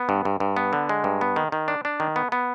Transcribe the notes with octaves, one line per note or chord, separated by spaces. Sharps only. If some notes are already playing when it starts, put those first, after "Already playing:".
Already playing: B3
G2
G2
G2
B3
D3
G#3
G2
B3
D#3
D#3
D4
D4
D#3
B3
B3